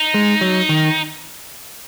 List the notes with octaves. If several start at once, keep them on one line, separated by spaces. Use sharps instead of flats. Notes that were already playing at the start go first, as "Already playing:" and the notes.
Already playing: D#4
G#3
F#3
D#3